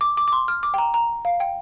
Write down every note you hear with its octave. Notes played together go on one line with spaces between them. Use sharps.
D6
D6
D6
C6
F6
D6
G5
A#5
A#5
F5
G5